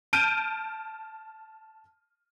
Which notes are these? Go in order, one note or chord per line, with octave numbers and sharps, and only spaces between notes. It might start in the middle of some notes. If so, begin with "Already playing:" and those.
A5 F6 G6 D7 D#7